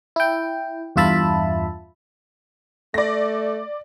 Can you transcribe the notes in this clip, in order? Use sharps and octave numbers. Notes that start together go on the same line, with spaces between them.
E4 G5
E2 G2 F4 E5 A5 B5
A3 D5 A#6